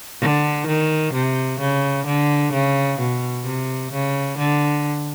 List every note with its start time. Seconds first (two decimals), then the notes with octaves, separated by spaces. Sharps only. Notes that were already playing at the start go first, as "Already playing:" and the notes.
0.21 D3
0.67 D#3
1.13 C3
1.60 C#3
2.06 D3
2.53 C#3
3.00 B2
3.46 C3
3.92 C#3
4.38 D3